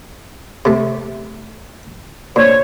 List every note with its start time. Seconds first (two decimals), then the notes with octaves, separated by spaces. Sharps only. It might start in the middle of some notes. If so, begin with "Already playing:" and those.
0.65 C3 A3
2.36 A#2 D4 C5 C#5